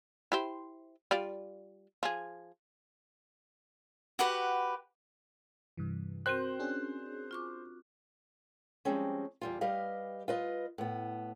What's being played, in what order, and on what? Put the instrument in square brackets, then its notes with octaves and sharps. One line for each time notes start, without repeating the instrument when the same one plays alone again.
[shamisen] E4 G4 C5
G3 F4 D5
F3 G#4
[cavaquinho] F#4 G4 B4 F#5
[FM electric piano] G2 C3 E3
[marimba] C4 F#4 A#4 [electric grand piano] C5 F#6 [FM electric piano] G5
[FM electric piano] C#4 D4 G#4
[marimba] F4 C#6 D6
[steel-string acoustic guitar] F3 G3 G#3 C4 C#4
E2 G3 F4
G3 G4 B4 D#5 F5
F4 B4 D#5
A2 B3